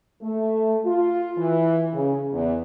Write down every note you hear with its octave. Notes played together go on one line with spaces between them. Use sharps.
A3
F4
E3
C#3
E2